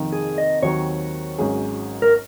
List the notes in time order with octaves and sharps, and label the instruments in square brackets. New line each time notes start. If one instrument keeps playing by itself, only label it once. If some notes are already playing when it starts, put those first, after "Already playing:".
Already playing: [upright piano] F2 C3 D#3 A#3 D#4
[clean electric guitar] G#4
D#5
[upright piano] D#2 D#3 F#3 C4 F#4 [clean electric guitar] C#5
[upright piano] G#1 G#2 F#3 C#4 G#4
[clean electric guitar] A#4